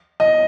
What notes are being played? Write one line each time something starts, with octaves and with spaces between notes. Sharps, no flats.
D#5